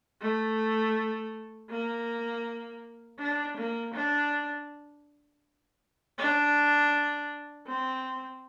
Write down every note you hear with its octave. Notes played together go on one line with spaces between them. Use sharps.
A3
A#3
D4
A#3
D4
D4
C4